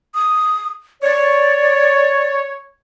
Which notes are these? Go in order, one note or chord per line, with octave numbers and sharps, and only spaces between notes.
D#6
C#5 D5